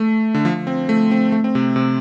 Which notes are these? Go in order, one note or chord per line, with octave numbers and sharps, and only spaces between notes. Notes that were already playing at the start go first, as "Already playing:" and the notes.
Already playing: A3
D3
F3
C4
A3
C4
A3
C4
C3
C3